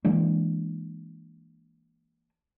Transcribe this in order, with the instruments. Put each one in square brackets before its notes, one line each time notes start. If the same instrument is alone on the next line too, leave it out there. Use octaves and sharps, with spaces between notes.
[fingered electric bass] E3 G#3 A#3 D4